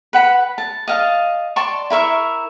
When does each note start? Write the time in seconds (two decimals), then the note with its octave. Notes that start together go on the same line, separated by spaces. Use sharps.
0.13 B4 F#5 B5
0.58 A5
0.88 D#5 F5 A5
1.56 D5 A5 C6 C#6
1.90 E4 A#4 E5 C#6